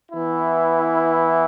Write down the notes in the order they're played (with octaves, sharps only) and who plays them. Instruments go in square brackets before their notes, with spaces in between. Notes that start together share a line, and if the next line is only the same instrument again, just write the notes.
[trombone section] E3 B3 E4